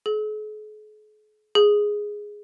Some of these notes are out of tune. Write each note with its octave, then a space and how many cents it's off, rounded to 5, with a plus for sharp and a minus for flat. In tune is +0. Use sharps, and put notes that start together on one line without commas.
G#4 +45
G#4 +0